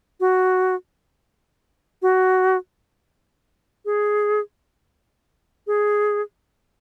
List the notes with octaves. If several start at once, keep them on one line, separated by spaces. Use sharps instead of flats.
F#4
F#4
G#4
G#4